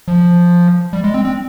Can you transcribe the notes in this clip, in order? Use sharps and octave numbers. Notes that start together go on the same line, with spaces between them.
F3
G3
G#3
C4
C4